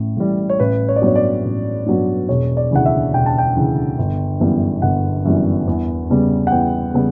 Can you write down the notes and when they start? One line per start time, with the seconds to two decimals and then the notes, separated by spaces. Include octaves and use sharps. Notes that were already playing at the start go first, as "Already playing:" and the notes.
Already playing: A1 A2
0.17 A2 E3 G3
0.49 C#5
0.59 A1 B4
0.88 C#5
0.96 D5
1.02 G2 F#3 B3 C#5
1.15 D5
1.45 A1
1.86 G2 F#3 B3
2.29 E1 C#5
2.57 D5
2.71 D2 C#3 E3 F#5
2.86 E5
3.13 E1 G5
3.26 A5
3.38 G5
3.56 D2 C#3 E3
3.99 G1
4.40 F#2 E3 G3 B3
4.82 G1 F#5
5.25 F#2 E3 G3 B3
5.67 E2
6.10 C#3 G3 B3
6.47 F#5
6.51 E2 G5
6.94 C#3 G3 B3